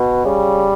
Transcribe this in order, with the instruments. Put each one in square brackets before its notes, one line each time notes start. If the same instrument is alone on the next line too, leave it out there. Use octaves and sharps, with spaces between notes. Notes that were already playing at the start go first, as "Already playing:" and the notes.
Already playing: [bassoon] B2
[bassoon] C#3 [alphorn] G3